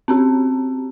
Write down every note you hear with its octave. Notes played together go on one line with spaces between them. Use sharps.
C4 C#4 G4